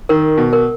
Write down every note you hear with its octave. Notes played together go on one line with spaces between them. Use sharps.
D#3 A#4
B2
A#4